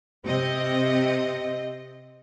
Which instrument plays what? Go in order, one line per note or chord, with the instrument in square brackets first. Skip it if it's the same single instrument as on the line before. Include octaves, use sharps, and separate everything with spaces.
[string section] C3 C4 D#5